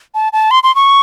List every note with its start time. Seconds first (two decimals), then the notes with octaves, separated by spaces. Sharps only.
0.14 A5
0.33 A5
0.51 C6
0.63 C6
0.75 C#6